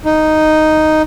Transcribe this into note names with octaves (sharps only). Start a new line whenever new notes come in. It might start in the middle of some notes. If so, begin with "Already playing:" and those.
D#4